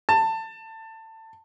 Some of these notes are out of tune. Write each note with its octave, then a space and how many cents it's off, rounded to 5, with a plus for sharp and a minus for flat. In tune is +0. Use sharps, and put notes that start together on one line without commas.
A5 +20